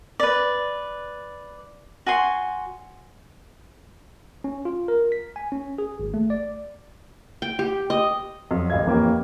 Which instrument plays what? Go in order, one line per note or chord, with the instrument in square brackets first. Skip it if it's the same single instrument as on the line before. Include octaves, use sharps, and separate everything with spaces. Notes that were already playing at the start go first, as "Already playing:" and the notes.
[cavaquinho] B4 D5
F#4 G#5 C6
[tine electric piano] C#4
F4
A#4
B6
G#5
C#4
G#4
G#1
A3
D5
[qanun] G5
G4
D#5
[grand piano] F2 F#3
D1 A1 D#5 F5 G#6
F2 E3 A#3 C#4 G4